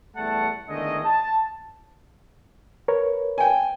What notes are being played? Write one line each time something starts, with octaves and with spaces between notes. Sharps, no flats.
E2 G3 A3 F#5 A5
E2 D3 D#3 G#3 A3 D#5
A5
A#4 B4 C#5
G5 G#5